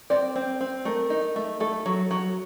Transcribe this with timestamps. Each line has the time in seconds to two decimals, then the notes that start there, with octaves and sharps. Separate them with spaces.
0.10 C4 D5
0.36 C4
0.61 C4
0.85 A3 A#4
1.10 D#4
1.36 A3
1.60 A3 A4
1.86 F#3
2.11 F#3